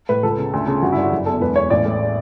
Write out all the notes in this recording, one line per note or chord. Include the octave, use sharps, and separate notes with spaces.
A2 B4
C#2 A4
C#3
D2
C#3
G1 F#4
E4
G2
F#4
F#1
E2 A4
E1 B4
E2 C#5
A1 D5
A2